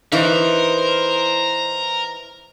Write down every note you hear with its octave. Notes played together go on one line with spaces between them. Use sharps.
E3 D#4 A#4 C5